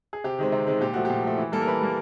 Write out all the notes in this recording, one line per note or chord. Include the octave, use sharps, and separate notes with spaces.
G#4
C3 G4
D#3 G#3 C4
C3
D#3 G#3 C4
A#2 G4
F3 A3 F#4
A#2 G4
F3 A3
E3
G3 A#3 A4
A#4
E3 B4
G3 A#3